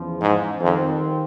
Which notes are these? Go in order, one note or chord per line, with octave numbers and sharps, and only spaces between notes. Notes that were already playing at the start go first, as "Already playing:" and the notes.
Already playing: E2 C#3 F3
G#2
F2 D#3 G3 C4